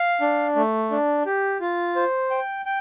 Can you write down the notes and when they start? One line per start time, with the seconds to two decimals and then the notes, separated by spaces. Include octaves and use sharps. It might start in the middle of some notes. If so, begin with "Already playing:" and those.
Already playing: F5
0.21 D4
0.56 A3
0.91 D4
1.26 G4
1.61 F4
1.96 C5
2.31 G5
2.66 G5